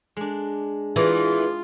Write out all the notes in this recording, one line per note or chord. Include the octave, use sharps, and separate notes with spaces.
G#3 D4
E3 F4 G#4 A#4 D5